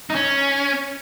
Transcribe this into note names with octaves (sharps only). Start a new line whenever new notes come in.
D#4
C#4